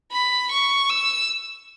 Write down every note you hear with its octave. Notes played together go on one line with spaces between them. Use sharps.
B5
C#6
E6